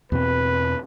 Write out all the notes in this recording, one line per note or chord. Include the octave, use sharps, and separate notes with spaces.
E2 B2 C4 B4